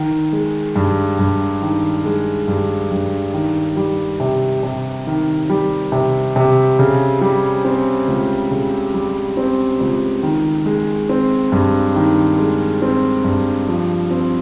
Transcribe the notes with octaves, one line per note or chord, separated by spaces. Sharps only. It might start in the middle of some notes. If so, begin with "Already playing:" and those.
Already playing: D#3
G#3
G2
G2
D#3
G#3
G2
G2
D#3
G3
C3
C3
D#3
G3
C3
C3
C#3
G3
C4
C#2
C#3
G3
C4
C#2
D#3
G#3
C4
G2
D#3
G#3
C4
G2
F3
C4